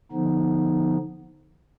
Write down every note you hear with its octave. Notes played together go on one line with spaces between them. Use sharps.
D3 F3 B3 D#4